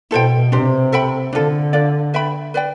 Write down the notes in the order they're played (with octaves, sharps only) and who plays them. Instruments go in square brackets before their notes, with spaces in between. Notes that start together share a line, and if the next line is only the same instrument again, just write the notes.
[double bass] B2 [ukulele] E4 A4 C5 G5
[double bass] C3 [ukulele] D4 G4 C5
[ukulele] A4 E5 G5 B5
[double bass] D3 [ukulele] D4 F4 A4
[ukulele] D4 F4 A4 D5
B4 E5 G5 B5
B4 D5 G5